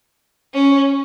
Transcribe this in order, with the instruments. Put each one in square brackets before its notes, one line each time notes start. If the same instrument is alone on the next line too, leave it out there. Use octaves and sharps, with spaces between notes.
[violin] C#4